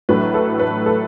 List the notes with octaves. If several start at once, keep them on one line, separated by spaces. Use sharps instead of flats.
A1 A2 F#3 A3 D4 B4
A4
B4
A4